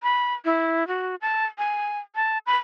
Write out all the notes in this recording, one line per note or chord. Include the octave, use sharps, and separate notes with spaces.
B5
E4
F#4
A5
G#5
A5
B5